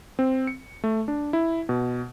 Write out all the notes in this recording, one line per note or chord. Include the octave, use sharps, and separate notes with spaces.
C4
C#7
A3
D4
E4
B2